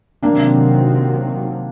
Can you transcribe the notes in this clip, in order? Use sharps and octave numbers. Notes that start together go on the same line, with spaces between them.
C3 D#3 F#3 A#3 C4 D4